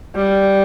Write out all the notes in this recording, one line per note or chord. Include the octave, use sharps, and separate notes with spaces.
G3